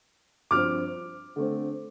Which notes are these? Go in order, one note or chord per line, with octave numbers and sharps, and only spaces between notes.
G2 F3 C4 D6 F6
D3 A3 C4